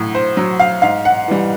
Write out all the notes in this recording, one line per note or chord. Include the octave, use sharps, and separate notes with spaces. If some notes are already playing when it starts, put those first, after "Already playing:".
Already playing: A2 F#3
C5
F#3
F5
G#2 F5
F#5
E3 G3